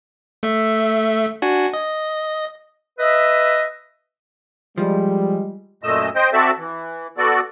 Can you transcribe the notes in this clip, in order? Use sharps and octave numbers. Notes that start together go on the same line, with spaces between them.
A3 E5
D4 F#4 G#5
D#5
B4 D#5 E5
F3 G3 G#3
F#2 A#2 A3 D#5 E6
C5 D#5 G5
C4 F#4 A4 D5 E5 A5
E3
B3 F#4 A4 D5